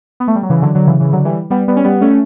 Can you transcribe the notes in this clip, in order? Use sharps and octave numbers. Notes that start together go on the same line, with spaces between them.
B3
A3
G3
F#3
C#3 E3
D3 F#3
D3 F#3
C#3 E3
C#3 E3
D3 F#3
E3 G3
G3 B3
G3 B3
C#4
G3 B3
A3 C#4